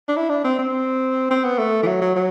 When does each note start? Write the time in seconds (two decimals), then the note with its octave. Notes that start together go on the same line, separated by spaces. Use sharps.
0.08 D4
0.16 E4
0.29 D4
0.45 C4
0.59 C4
1.30 C4
1.44 B3
1.58 A3
1.83 E3
1.87 F#3
2.01 F#3
2.16 F#3